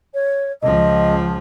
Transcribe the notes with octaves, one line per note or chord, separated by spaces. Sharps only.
C#5
C#2 F3 D#5